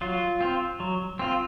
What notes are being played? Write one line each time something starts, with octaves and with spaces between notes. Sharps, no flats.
F#3 F4
C4 F4
F#3
C4 F4